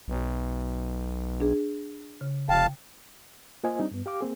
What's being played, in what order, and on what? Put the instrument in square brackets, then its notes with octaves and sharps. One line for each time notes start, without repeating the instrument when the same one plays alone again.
[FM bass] B1
[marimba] D4 G#4
C#3
[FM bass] F1 [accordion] F5 A5 [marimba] G5
[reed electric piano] A#3 F4 C5 D#5 G#5
G3 C4 D4 D#4
G2 B3
G4 F5 D6
A#3 C4 G#4